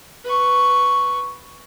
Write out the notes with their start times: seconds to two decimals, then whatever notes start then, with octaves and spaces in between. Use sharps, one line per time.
0.24 B4 C#6